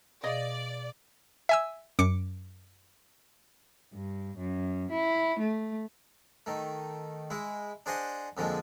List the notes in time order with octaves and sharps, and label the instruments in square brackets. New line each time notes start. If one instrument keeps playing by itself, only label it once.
[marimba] B2 G#4 F5 [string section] D5 [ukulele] D#5
[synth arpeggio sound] E5 G#5 E6
F#2 D6 C#7
[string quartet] G2
F#2
E4
A3
[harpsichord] D#3 A3
G#3 E4
D4 G#4 C5 D#5 F#5
F2 D3 F3 G#3 A#3